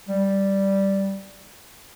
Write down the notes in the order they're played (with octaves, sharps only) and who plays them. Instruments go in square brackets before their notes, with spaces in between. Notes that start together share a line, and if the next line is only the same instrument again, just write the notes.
[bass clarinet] G3